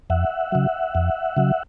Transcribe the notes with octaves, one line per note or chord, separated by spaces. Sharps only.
F2 E5 F#5
C#3 F#3
F2
C#3 F#3